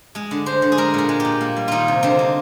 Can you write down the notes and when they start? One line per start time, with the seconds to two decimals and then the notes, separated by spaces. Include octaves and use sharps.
0.15 G#3 G#4
0.31 D3
0.46 G#3 C5
0.62 D3
0.72 G#4
0.77 G#3 A#4
0.94 A#2 A#4
1.09 G#3
1.20 A#2 G4
1.41 A#3
1.57 G3
1.68 D#3 D#4 F4
1.88 C3
2.03 D3 C4
2.19 A#3